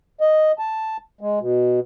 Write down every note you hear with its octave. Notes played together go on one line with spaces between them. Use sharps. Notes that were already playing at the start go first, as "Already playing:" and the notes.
D#5
A5
G#3
B2